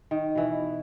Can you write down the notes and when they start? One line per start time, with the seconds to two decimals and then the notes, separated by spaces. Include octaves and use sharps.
0.11 D#3
0.35 B2 E3